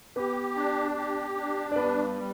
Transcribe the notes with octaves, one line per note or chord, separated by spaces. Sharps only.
B3 G4 B4
D4
G4
D4
D5
G2 B3 B4
G3